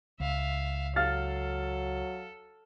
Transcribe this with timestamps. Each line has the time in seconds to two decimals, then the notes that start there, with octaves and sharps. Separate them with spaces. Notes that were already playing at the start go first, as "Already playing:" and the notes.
0.20 C#2 E5 F5
0.96 F#3 A4 F5 F6 A6